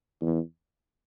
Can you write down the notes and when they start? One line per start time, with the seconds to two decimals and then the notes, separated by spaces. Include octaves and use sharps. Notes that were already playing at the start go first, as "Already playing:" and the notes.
0.21 E2